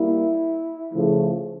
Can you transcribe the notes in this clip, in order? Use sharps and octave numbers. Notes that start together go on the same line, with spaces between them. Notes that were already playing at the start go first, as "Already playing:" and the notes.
Already playing: G3 A#3 E4
C#3 F3 A3